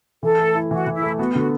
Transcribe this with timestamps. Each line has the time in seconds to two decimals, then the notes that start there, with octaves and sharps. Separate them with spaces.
0.23 E3 A4
0.39 A3
0.55 E4
0.71 E3 F#4
0.87 E3
0.95 E4
1.03 A3
1.18 B3 F#4
1.35 D3 F#4